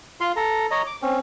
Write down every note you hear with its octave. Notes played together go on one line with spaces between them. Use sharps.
F4 F5 C6
A4 A#5
C#5 D#5 A#5
D6
C4 C#4